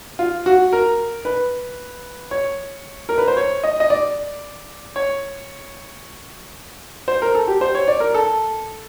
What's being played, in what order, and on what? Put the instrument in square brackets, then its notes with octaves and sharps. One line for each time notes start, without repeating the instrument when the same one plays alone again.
[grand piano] F4
F#4
A#4
B4
C#5
A#4
B4
C5
C#5
D#5
D#5
D5
C#5
C5
A#4
A4
G4
C5
C#5
D5
A#4
A4